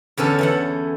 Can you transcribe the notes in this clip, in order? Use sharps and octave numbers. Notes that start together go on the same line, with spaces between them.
E2 D3 C#4 A4
E3 A4 F#5